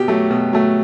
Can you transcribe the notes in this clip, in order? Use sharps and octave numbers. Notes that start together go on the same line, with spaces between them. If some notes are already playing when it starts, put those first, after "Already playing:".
Already playing: B2 G4
F#3 A3
B2
F#3 A3